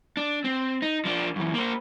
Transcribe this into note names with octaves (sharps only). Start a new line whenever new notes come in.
D4
C4
D#4
F3 D4
F#2 E3
A#3 C5